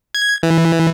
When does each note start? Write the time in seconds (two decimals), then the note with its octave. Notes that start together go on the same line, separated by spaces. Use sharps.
0.15 G#6
0.43 E3